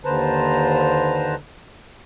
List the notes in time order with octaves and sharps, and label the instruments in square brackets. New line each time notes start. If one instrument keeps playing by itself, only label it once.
[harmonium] D#2 D3 B4 C5 A5 A#5